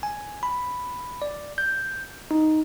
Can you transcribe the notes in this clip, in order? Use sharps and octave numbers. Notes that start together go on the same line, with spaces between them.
G#5
B5
D5
G6
D#4